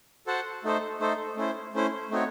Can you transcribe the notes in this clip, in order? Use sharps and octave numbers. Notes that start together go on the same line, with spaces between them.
F#4 A4 C5 F#5 A5
A3 D#4 A4 C5
A3 D#4 A4 C5
A3 C#4 E4 C5
A3 C#4 E4 C5
A3 C4 D#4 F#4 C#5